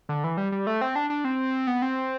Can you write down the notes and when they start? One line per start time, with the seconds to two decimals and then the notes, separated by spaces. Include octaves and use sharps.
0.09 D3
0.24 E3
0.37 G3
0.52 G3
0.67 A3
0.81 C4
0.95 D4
1.10 D4
1.25 C4
1.67 B3
1.82 C4